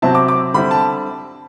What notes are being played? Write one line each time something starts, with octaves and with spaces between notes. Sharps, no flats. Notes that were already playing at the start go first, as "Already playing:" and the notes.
C3 F#3 C4 E4 A5
D6
D6
D3 G3 C4 E4 B5
A5